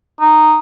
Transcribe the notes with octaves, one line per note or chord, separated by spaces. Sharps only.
D#4